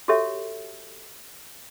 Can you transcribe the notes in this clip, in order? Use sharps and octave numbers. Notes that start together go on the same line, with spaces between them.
F#4 G4 A4 C#5 E5